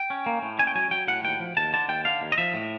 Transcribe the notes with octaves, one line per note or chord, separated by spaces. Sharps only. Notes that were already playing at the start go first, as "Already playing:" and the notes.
Already playing: G5
C#4
A#3
A2
C#4 G#5
G5
F#3 G#5
F#3 G5
A2 F#5
D#2 G5
F3
D#2 A5
D3 A5
D#2 G5
D3 F5
D#2
D#5
F3 E5
A2